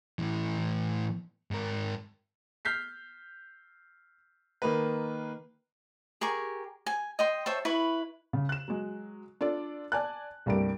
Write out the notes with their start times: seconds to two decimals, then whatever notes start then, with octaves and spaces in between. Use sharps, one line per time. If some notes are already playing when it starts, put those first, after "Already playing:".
0.19 A2 E3
1.51 G#2 A#4
2.65 F6 G6 B6 C7
4.62 D#3 A#3 B4
6.21 G4 G#4 A#4 C#6
6.86 G#5
7.19 D#5 G5 C6
7.46 C5 C#5 E5 A5
7.65 E4 B4 C#6
8.33 C#3
8.49 F#6 E7
8.68 F#3 G#3
9.41 D4 F4 A4 D5
9.92 D5 G#5 A5 F#6
10.46 C2 G2 G3 A3 A#3 D7